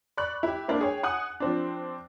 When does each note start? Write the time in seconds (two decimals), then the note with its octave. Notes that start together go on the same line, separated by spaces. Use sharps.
0.17 D5 B5 C#6 F#6
0.43 E4 G4
0.68 A#3 D4 E4 C5
0.81 G#4 C#5 G5
1.03 F#5 G#5 D#6 F#6
1.40 F3 C4 D4